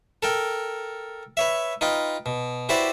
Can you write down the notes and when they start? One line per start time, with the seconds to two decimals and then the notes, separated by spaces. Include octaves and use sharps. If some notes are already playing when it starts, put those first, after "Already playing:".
0.23 A4 A#4 G5
1.37 B4 C#5 E5
1.81 D#4 F4 B4 G5
2.26 B2
2.69 E4 F#4 G4 B4 C5 D5